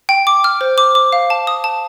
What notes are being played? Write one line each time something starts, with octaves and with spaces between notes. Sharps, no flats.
G5
D6
F6
C5
D6
D6
F5
A5
D#6
A5